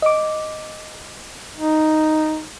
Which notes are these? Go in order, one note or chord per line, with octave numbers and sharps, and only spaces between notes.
D#5 D6
D#4